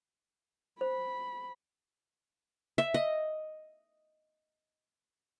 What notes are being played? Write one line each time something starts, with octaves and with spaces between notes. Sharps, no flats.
C5 B5
E5
D#5